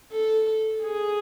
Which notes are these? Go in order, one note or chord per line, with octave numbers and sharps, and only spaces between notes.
A4
G#4